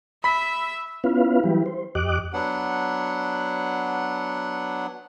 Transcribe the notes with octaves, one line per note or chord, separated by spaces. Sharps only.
E5 B5 B6
B3 C#4 E4 F4 B4 F5
E3 F#3 G3 E4 G4 B4
C5
F2 G4 D#5 D6 F#6
F#3 B3 D4 F#5